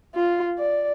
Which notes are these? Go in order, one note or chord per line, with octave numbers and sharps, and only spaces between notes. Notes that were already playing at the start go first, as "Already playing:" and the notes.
F4
D5